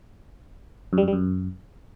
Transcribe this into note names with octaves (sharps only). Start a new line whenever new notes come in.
F#2
G3
F#2
G3
F#2